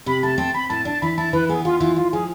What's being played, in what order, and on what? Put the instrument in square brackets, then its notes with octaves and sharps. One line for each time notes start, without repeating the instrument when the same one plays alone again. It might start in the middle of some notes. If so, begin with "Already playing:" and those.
[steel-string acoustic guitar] C3 [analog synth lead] B5
[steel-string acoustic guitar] A3 [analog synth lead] A5
[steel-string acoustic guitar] C4 [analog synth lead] A5
[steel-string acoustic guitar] C4 [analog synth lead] B5
[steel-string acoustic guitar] A2 [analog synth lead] A5
[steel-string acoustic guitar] D4 [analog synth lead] A5
[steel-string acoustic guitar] E3 [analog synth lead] B5
[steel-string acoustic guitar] E4 [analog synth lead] A5
[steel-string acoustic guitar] E3 [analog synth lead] B4
[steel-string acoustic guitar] B3 [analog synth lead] G#4
[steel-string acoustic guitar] E3 [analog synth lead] F4
[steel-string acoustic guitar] E3 [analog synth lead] F4
[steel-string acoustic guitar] G#2 [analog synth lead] F4
[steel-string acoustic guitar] F3 [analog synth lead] G#4